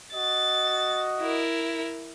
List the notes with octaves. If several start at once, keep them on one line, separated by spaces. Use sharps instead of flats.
F#4 D#5 A6
E4 A#4